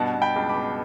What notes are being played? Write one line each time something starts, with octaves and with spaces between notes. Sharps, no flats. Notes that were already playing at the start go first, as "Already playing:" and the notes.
Already playing: G2 B2 F#5 A5
B2
G5 B5
C#2
B5 D6
B2